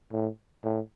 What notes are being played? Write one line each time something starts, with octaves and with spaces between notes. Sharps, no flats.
A2
A2